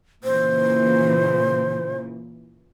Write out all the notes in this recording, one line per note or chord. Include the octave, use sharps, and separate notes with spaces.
A#2 C#3 E3 C5